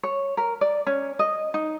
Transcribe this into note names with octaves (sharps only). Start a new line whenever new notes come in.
C#5
A#4
D5
C#4
D#5
D#4